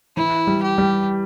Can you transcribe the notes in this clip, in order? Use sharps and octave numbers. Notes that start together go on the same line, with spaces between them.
E3 E4
G3
G4
G3